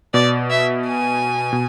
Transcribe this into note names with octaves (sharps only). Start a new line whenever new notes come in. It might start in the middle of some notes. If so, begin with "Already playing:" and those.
B2 D5
E5
G#5
B2